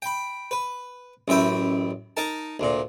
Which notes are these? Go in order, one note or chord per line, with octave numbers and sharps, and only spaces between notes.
G5 B5
B4
A1 F#2 E5 G5 B5
D#4 A#4 A5
D2 A#2